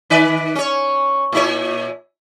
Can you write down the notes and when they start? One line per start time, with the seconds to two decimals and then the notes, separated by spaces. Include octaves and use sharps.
0.10 D#3 B4 D5
0.55 C#4 C#5
1.32 A#2 E4 C#5